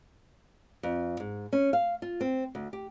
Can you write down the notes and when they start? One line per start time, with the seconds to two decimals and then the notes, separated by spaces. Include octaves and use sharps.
0.83 F2
1.20 G#2
1.53 C#4
1.73 F5
2.02 F4
2.21 C4
2.55 D2
2.73 G4